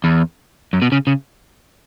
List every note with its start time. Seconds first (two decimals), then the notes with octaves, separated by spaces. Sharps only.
0.04 E2
0.73 F#2
0.82 B2
0.92 C#3
1.07 C#3